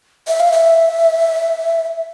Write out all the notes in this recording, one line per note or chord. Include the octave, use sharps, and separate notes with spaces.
E5
F5
E5